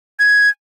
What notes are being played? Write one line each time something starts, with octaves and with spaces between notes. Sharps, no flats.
G#6